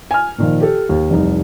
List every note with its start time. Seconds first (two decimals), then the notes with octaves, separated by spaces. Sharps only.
0.11 G#5 F6
0.38 A#2 D#3 F3
0.61 G4 A4
0.89 D#2
1.10 F1 C2 D#4